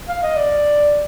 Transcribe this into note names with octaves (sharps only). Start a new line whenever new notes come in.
F5
D#5
D5